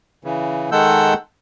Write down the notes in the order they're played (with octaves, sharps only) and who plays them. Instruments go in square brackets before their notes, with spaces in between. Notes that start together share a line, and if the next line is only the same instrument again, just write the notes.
[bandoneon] C#3 E3
D#3 G#3 A4 F#5 E6 G6